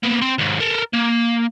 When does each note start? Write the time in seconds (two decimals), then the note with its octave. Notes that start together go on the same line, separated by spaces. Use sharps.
0.03 A#3 B3
0.22 C4 C6
0.38 D#2 G#2
0.60 A4 A#4
0.93 A#3